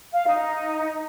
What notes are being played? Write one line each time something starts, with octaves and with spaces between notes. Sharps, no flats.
F5
D#4